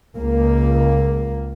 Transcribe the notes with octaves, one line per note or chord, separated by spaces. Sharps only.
C#2 A#3